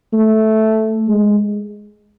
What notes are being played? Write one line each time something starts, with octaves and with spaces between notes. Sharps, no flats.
A3
G#3